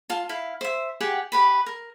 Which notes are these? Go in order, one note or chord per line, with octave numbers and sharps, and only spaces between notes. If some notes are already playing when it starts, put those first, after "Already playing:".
F4 A5
E4 F5
C5 E5
G4 G#4 F#5 G5
G4 B4 B5
A#4